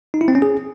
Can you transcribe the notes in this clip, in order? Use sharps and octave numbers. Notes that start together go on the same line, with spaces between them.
D#4
E4
C4
C#4
G#4